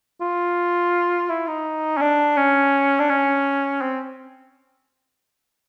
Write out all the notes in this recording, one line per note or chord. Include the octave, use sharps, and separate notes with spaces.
F4
E4
D#4
C#4
D4
C#4
D4
C#4
C4